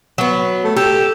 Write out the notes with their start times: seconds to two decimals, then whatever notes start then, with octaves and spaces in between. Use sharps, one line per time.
0.18 F#3 B3
0.64 A3
0.76 G4 A4